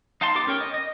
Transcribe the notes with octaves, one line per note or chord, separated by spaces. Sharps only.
D#4 F5 G5 A5 C6
B3 G4 A5 D6
C#4 A#4 C#5 G5
D#5
D#5